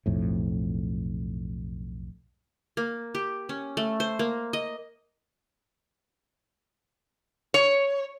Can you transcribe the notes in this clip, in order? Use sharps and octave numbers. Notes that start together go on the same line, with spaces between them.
B1 F2 A2
A#3
G4
C#4
A3
C5
A#3
D#5
C#5